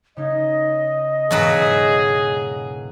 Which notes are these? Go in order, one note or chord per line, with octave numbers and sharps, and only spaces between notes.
C#3 D#4 D#5 G#6
E1 G#2 B2 F#3 G#4 B4